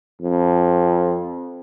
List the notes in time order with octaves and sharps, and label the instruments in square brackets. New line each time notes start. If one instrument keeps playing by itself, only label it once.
[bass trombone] F2